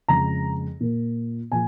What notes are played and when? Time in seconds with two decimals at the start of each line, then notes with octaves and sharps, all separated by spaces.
0.08 F2 C#3 G#3 A#5
0.80 A#2 A#3
1.52 A#2 F3 G#5